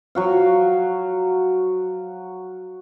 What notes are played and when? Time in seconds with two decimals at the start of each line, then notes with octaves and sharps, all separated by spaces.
0.15 F#3 F#4 F5